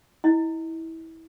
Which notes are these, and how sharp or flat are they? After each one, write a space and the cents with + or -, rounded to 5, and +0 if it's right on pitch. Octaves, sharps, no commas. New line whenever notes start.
E4 -20 D#5 +15